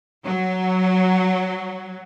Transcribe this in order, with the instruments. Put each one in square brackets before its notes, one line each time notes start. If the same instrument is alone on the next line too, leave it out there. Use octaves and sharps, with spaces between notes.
[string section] F#3